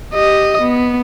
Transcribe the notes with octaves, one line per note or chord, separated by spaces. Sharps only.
G4 D#5
B3